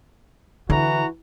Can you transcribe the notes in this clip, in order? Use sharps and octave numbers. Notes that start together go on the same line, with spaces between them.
D3 E3 E4 F#4 A#5